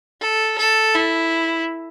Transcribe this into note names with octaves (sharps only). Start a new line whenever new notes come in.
A4
A4
E4